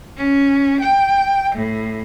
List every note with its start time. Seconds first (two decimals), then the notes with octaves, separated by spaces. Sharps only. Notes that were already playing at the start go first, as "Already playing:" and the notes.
0.17 C#4
0.80 G5
1.55 A2